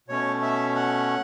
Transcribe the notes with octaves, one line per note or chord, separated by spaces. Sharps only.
B2 A3 C#4 C#5
E5
F#5